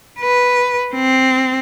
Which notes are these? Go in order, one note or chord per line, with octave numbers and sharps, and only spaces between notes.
B4
C4